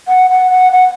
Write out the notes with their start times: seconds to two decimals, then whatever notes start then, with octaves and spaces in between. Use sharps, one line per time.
0.07 F#5
0.29 F#5
0.51 F#5
0.72 F#5